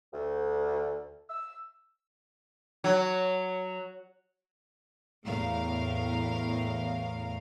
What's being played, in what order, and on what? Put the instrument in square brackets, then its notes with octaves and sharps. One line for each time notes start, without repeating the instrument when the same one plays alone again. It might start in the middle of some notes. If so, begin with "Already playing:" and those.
[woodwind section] D2
E6
[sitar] F#3
[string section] E2 A2 A#4 F5